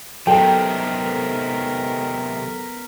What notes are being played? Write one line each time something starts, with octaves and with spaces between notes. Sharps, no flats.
C3 D#3 F#3 B3 A4 A#4 G5